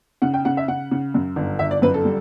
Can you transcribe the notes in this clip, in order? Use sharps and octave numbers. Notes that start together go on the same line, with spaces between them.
C#3 F#5
G5
C#3 F#5
E5
C#3 F#5
C#3
F#2
G1
G1 E5
D5
F#2 B4
A4
G3